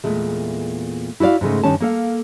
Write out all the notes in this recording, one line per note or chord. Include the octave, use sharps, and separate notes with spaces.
E2 A#2 G#3 A3
E4 F#4 G#4 D5 F5
G#2 C#3 G#3 A3
G2 D#3 G3 C#4 A5
A#3 A4 F5